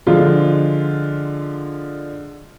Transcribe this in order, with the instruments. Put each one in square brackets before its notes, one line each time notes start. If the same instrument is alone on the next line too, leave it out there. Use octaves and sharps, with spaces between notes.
[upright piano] D3 F3 G#3 F4